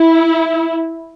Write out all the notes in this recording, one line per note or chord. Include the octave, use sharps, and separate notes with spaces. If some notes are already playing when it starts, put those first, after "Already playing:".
Already playing: E4